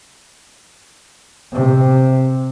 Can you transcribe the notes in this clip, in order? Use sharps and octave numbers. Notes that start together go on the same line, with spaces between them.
C3